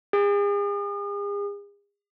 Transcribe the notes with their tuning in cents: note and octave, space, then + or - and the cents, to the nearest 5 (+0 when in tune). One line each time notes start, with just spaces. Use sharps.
G#4 -40